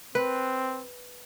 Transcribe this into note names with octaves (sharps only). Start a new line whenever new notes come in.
C4 B4